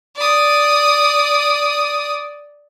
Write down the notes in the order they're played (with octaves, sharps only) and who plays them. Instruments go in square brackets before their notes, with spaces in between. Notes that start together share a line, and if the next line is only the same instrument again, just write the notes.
[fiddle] D5 D#6